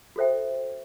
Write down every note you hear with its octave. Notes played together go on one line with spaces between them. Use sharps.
F#4 A4 C5 E5 G5